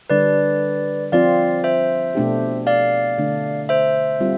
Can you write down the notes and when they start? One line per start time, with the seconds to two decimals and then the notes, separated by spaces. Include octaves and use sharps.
0.10 D3 G3 D4 B4 D5
1.12 F3 C4 F4 D5 F5
1.64 C5 E5
2.15 B2 A3 D4 G4
2.67 D5 F5
3.18 D3 A3 D4
3.69 C5 E5
4.20 G3 C4 F4